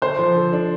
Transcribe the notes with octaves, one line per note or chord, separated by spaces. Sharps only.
D3 C5
F3
D3
D4